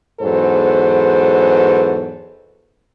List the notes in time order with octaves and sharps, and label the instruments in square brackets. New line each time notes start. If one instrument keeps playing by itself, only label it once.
[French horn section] E2 G#2 F#3 A4 B4 C5